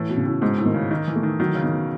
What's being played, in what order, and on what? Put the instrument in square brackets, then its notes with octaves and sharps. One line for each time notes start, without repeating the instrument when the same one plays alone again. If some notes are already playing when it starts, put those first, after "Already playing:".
Already playing: [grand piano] A2 [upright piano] E3
[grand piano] B2
[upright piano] C#3
[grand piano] A2
[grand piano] G#2 [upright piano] G#3
[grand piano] A2
[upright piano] D#3
[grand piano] C#3
[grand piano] D#3 [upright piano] D#4
[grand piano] E3
[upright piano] A3
[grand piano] D#3
[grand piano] D#3 [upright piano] F#3
[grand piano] C#3
[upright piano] D#3
[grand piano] B2